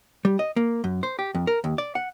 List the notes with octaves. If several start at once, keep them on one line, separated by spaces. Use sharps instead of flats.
G3
D#5
A#3
F#2
C5
G4
F2
A#4
D#2
D5
F#5